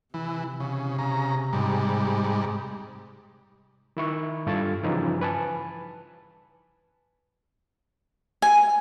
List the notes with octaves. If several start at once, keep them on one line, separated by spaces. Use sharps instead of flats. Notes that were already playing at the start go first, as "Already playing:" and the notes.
C3 E3
C#3
C#3 A#5
G#2 G3
D#3 E4 C#6
G2 F4 A4 F5 G#6 A6
G2 C#3 E3 F3 D#4 E4
B4 G#5 A5
G#5